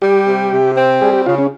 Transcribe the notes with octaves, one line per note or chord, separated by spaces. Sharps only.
G3 G4
C3
C3
C4
G3 G#4
G4
C#3 F4
C#4